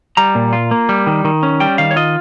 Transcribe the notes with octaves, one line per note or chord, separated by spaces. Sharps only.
G3 A#5
A#2
F4
A#3
G3
D#3
D#3
C#4
G3 G5
D#3 F5
C#5
F4 D#5